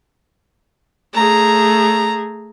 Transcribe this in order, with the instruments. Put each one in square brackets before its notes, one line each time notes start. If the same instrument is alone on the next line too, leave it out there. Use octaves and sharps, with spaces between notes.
[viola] A3 G#4 [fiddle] A#5